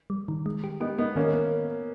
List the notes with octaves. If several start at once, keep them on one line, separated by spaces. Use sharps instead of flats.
G3
D#3
G#3
G4
B3 D#4 G4
G#3 B3 D#4
D#3 A#3 C#4
B3